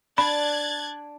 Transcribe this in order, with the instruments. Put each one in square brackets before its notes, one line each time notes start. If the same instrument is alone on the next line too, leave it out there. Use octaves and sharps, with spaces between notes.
[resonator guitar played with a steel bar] D4 [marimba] B5 [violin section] F#6 G#6 A6